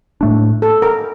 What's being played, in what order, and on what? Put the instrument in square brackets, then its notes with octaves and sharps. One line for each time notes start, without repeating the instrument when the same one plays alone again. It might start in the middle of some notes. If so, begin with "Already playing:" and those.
[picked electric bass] A2 A3 D4
[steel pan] A4
A#4